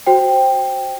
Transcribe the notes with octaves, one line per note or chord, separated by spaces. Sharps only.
F#4 C5 G5